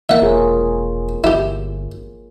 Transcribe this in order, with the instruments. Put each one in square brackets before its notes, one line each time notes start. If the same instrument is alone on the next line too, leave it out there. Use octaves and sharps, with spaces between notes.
[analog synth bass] E3 [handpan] F3 A#3 A#4 [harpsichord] E5 F#5
[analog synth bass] E1 [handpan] F4 G#4 C#5
[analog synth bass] G1 [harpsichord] E4 G4